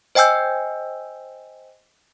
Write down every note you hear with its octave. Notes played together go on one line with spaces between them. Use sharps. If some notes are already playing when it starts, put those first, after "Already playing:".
C5 D#5 G5 G#5 E6 G6